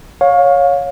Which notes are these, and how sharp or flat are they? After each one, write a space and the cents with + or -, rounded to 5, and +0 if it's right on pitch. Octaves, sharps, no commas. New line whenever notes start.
C#5 +0 F5 +25